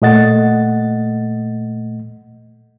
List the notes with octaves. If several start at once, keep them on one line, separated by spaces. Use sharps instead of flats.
A#2 A3 D#5 F#5 A6